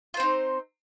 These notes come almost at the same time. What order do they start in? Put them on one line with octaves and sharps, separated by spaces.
F4 C5 C4 D#4